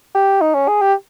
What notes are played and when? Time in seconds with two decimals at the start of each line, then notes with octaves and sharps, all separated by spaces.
0.15 G4
0.41 D#4
0.55 C#4
0.68 G#4
0.82 G4